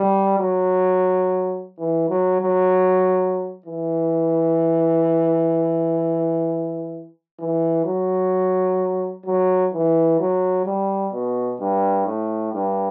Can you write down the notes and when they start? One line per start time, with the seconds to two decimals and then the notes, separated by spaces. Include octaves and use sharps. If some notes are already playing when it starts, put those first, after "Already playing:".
Already playing: G3
0.39 F#3
1.79 E3
2.09 F#3
2.41 F#3
3.66 E3
7.40 E3
7.85 F#3
9.26 F#3
9.73 E3
10.19 F#3
10.66 G3
11.13 B2
11.60 G2
12.06 A2
12.53 G2